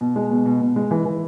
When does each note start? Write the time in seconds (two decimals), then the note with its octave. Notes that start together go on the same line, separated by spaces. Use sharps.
0.01 B2
0.16 G#3
0.31 B2
0.46 B2
0.61 B2
0.76 G#3
0.91 E3
1.05 E3